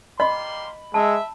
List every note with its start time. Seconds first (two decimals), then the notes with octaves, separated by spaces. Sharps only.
0.20 G3 A#3 D#5 B5 C6
0.94 G#3 E5 A5